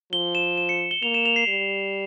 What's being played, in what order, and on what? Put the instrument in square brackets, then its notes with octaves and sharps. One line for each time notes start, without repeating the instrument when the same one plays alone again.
[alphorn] F3 [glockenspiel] G7
[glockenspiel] E7
E7
C#7
G7
[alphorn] A#3 [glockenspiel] F7
[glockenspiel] E7
F7
C7
[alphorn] G3